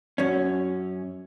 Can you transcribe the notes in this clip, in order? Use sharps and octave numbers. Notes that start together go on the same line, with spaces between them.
F#2 C#4